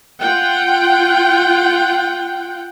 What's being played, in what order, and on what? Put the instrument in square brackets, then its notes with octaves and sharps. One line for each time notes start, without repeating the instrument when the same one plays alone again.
[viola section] F4 F#5 G5